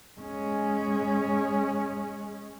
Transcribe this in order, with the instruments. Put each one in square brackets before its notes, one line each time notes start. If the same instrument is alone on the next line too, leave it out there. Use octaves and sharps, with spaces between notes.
[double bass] G#3 C#4